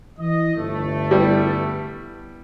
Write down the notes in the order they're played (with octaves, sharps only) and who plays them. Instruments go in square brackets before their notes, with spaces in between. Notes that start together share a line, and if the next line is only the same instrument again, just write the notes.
[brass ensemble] E3 D#5
G1 A3
[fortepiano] G3 B3 E4